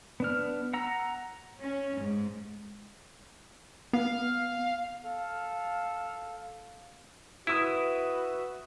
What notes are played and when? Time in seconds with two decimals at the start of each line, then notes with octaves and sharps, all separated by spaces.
0.20 B3 D4 F6
0.73 F#5 A#5 E6
1.58 C#4
1.98 G#2
3.93 B3 F5
5.02 A4 F5
7.47 E4 F#4 B4 E5 D#6 E7